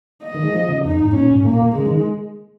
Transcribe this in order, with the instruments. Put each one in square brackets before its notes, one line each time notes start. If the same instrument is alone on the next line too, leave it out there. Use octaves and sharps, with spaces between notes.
[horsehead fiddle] D#5
[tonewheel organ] D#3
G#3
F3
C#3
[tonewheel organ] F2 [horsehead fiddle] D#4
[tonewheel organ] G#2
[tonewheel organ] A#2 [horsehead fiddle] C#4
[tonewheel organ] G#2
[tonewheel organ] A#2 [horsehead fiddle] A#3
[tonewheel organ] C#3 [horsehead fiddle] G#3
[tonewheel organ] D#3